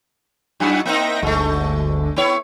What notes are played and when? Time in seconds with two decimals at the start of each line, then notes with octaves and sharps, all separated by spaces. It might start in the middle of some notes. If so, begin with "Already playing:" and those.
0.60 F#2 E4 F#4 G#4 F#5
0.85 A#3 C4 D#4 E5 G5 A#6
1.22 G1 D2 D3 G#3 A3
2.16 B3 E4 C#5